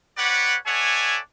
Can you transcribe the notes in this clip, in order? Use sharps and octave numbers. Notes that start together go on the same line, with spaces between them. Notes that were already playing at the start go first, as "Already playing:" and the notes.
G4 B4 C#5 D5 F#5
A4 C#5 D5 E5 F#5 G#5